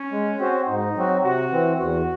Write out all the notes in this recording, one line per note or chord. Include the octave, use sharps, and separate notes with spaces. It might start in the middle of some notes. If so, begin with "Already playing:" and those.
Already playing: C#4
G#3
C4 F#4 C5
G#2 D#4
F#3 C4 F#4
C3 F#4
E3 C4
E2 F#4